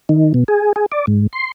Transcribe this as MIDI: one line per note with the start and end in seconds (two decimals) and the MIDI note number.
0.09 0.33 51
0.34 0.44 47
0.48 0.73 68
0.76 0.86 68
0.92 1.05 74
1.07 1.27 44
1.33 1.51 84